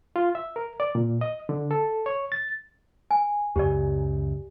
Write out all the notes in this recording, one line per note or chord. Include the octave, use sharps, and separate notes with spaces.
F4
E5
A#4
D5
A#2
D#5
D3
A4
C#5
A6
G#5
C#2 F#2 C#3 G4 D5